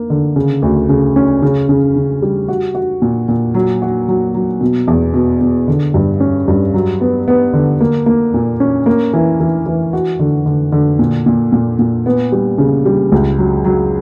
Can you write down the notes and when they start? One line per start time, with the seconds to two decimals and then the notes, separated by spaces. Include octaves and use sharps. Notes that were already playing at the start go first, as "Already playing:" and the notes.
Already playing: A#3
0.10 D3
0.36 C#3
0.62 D2
0.89 C#3
1.16 C#4
1.42 C#3
1.69 C#3
1.96 C#3
2.22 G3
2.48 F#4
2.75 F#4
3.02 A#2
3.28 A#2
3.54 F#3
3.82 F#4
4.08 F#3
4.34 F#3
4.61 B2
4.88 E2
5.14 B2
5.41 B2
5.68 D3
5.94 G2
6.20 C#4
6.48 G2
6.74 F#3
7.01 B3
7.28 B3
7.53 D3
7.81 A#3
8.06 A#3
8.34 A#2
8.60 C#4
8.86 A#3
9.13 E3
9.40 E3
9.66 E3
9.93 F#4
10.19 D3
10.46 D3
10.72 D3
10.99 A#2
11.26 A#2
11.52 A#2
11.79 A#2
12.06 B3
12.32 G3
12.58 C#3
12.85 G3
13.12 C#2
13.38 F#3
13.65 F#3